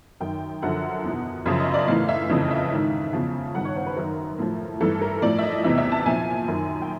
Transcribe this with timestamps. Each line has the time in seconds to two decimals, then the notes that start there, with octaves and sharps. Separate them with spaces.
0.20 F#2 D#3 G5
0.62 F#2 D3 F3 F#5
1.04 E2 B2
1.45 F#2 C#3 F3 E5
1.60 D#5
1.74 D5
1.88 A2 E3 F5
2.09 E5
2.30 F2 C#3 E3 D#5
2.51 E5
2.71 G#2 D#3
3.13 E2 C#3 F3
3.55 G2 D#3 F#5
3.65 C#5
3.76 C5
3.86 B4
3.96 F#2 D#3 A#4
4.39 A2 F3
4.81 G2 E3 A4
5.01 A#4
5.22 A2 F3 D5
5.39 E5
5.43 D#5
5.64 E2 C3 E3 E5
5.78 E5
5.92 A5
6.06 A#2 F3 G#5
6.48 F#2 D#3
6.82 G5